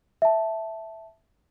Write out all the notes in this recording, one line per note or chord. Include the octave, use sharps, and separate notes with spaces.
E5 A5